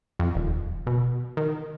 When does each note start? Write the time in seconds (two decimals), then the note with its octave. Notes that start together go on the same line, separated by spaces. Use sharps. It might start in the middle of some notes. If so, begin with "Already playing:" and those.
0.19 F2
0.35 D#1
0.87 B2
1.37 D#3